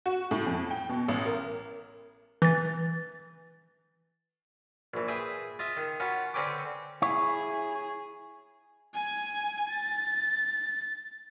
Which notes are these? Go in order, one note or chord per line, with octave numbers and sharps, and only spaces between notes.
F#4
A2
F2
G5
B2
A1
A#4
E3 A6
A#1 E3
G#4 B4 E5 G5
F4 D#5 E5
D#3
C#4 F4 F#4 F#5 B5
D3 C4 C#4 B4 G5 D6
E4 G#4 C#5
G#5 G#6
A6